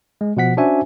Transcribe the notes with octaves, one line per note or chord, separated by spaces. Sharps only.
G#3
B2 F3 F#5 B6
C#4 D4 F#4 C5 E5 G#5